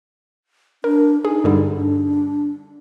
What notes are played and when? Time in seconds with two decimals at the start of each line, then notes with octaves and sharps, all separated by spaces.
0.84 D4 A#4
1.25 D#4 G#4
1.44 G2 D3 G3
1.76 D4